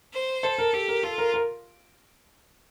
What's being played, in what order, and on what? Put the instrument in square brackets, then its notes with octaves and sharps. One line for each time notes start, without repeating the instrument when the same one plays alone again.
[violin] C5
[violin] A4 [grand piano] C5
[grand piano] A#4
[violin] G4 [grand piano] A4
[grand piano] A#4
[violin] F4 [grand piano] A4
[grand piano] A#4
A#4